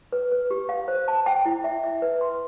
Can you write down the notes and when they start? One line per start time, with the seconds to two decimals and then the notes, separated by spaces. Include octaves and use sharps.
0.12 B4
0.32 B4
0.51 G4
0.69 F5
0.88 C5
1.08 A5
1.26 G5
1.46 E4
1.64 E5
1.84 E5
2.02 B4
2.21 C6